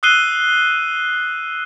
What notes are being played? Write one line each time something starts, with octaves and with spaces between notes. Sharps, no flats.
D#6 E6 F#6 C7 D#7 G7